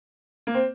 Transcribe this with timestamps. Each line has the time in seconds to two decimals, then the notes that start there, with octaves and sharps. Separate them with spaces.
0.47 A#3
0.54 C4